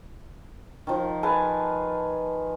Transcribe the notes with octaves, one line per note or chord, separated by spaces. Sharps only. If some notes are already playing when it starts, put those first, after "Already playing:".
D#3 F3
B4 F5 G#5 A5